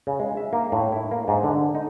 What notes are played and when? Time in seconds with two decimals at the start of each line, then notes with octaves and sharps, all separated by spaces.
0.07 C#3
0.19 G#3
0.37 E5
0.53 A#3
0.72 A2
0.92 E4
1.11 A#3
1.28 G#2
1.43 D3
1.75 D#4